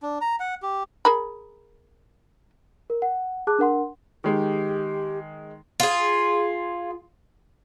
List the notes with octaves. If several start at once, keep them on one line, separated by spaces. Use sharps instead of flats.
D4
A#5
F#5
G4
G#4 A#4 B5
A#4
F#5
G#4 A5 D6 F#6
D4 A#4 F#5 C6
D#3 G#3 G4
F4 G#4